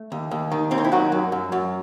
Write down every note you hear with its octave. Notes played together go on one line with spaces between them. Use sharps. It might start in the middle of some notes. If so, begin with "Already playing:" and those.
Already playing: A3
D#2
D#2
D#3
D#2 C4
D#4
E4
D#3 F#3 F#4
F#2
F#2
F#2